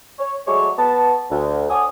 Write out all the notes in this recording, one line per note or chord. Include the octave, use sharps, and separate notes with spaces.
C#5
F#3 G#3 A3 C#5 D5 C#6
B3 A5
D2
A4 C#5 F#5 G#5 D6 D#6